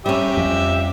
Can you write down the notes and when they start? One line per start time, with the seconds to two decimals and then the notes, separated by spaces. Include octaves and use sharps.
0.06 G3 C#4 G4 E5
0.37 F2